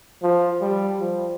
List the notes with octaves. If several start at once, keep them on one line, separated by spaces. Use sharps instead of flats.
F3
G3
F3